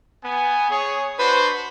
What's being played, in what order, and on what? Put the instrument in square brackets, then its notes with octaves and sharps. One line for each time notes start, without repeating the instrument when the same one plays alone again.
[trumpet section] B3 G#5
G#4 C#5
[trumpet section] D4 F#4 C5 [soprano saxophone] B4